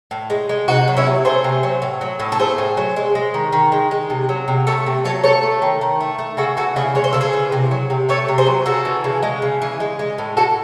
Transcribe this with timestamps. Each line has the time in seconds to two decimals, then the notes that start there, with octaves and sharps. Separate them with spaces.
0.11 A2
0.30 G#3
0.49 G#3
0.68 C3 D#4 F#4
0.88 F#3
0.97 C#4 E4
1.06 C3
1.25 A3 G#4 C5
1.44 C3
1.63 F#3
1.82 A2
2.01 F#3
2.20 A2
2.32 A4
2.39 A3 G#4 C5
2.58 A2
2.77 F#3
2.96 G#3
3.15 G#3
3.34 D#3
3.53 D#3
3.72 G#3
3.91 G#3
4.10 C3
4.29 F#3
4.48 C3
4.67 A3 A4 C#5
4.86 C3
5.05 F#3 A4 C#5
5.24 A3 A4 C#5
5.43 A3
5.62 D#3
5.81 D#3
6.00 A3
6.19 A3
6.37 C#3 F#4 A4
6.57 E3 F#4 A4
6.76 C#3 E4 G#4
6.95 G#3 C#5
7.04 C5
7.13 C#3 A4
7.21 G#4 C5
7.33 E3
7.52 C3
7.71 F#3
7.90 C3
8.09 A3 A4 C#5
8.28 C3
8.38 G#4 C5
8.47 F#3
8.66 C#3 F#4 A4
8.85 E3
9.04 C#3
9.23 G#3
9.42 C#3
9.62 E3
9.80 G#3
9.99 G#3
10.18 A2
10.37 A2 F#4 A4